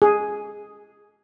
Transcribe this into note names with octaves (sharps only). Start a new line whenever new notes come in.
G#4